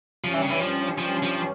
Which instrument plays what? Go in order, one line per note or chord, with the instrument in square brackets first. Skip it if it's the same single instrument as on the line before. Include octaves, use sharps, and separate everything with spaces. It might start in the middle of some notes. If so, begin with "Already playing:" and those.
[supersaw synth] G2 G3 C#4 [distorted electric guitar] F3
[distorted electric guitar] E3
C#3
E3
F3
F3
F3